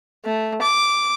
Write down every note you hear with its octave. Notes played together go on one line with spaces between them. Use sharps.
A3
D6